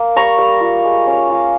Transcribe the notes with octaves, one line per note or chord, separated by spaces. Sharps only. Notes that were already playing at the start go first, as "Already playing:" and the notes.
Already playing: A#3
G3 A#5 C#6
G3
F4
G#3
C#4
F4